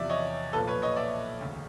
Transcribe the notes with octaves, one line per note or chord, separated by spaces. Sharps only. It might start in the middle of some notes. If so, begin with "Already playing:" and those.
Already playing: E2 C3 F3 D5 E5
C#5 D#5
B1 A#2 F3 A4 B4
B4 C#5
C#5 D#5
D5 E5
E1 D2 C#3